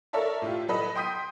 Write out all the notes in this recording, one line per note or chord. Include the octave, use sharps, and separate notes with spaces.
A4 A#4 C#5 D5 E5 A5
A2 E4 F4 G4
F#3 A4 B4 D#5
G5 C6 D#6 G6 B6 D#7